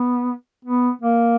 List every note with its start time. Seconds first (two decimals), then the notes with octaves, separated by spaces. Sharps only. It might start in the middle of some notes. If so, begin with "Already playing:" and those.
Already playing: B3
0.65 B3
1.02 A#3